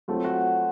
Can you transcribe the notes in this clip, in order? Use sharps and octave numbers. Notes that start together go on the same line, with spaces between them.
F#3 A3 C4 F4 A4
F#4